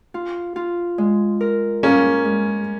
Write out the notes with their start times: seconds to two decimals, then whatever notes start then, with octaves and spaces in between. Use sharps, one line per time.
0.14 F4
0.56 F4
0.98 G#3
1.41 A#4
1.83 A#3 C#4 G#4
2.25 G#3